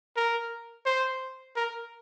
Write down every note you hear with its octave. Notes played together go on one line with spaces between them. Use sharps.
A#4
C5
A#4